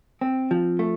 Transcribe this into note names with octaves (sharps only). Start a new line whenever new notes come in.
C4
F3
A3